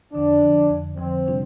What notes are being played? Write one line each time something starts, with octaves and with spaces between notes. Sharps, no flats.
F2 D3 F3 D4
F2 D3 F3
F2 D3 F3
F2 D3 F3 C4
C3 G3 D4 F4